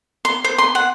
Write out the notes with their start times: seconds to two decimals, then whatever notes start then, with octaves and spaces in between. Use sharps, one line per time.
0.25 C6
0.44 C5
0.58 C6
0.75 F#5